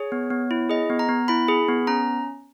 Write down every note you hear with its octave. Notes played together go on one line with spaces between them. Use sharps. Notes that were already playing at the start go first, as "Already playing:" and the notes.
Already playing: G#4 C#5
B3
B3
E4
G#4 D#5
B3
A#5
B3
E4 B5
G#4
B3
C#4 A#5